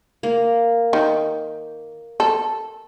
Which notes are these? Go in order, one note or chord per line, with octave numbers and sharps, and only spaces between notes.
A#3
D#3
A4